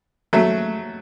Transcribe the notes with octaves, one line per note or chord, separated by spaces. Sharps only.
F#3 A3